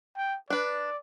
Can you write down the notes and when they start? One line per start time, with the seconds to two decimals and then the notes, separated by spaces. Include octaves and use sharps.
0.17 G5
0.50 D4 B4 D5